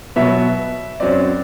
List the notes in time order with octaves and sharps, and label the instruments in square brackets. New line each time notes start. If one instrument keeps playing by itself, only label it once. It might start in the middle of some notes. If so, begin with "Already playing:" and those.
[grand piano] B2 F#3 B3 E5
F#2 F#3 C4 D5